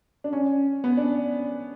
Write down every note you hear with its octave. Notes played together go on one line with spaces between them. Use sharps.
D4
C#4
B3
D4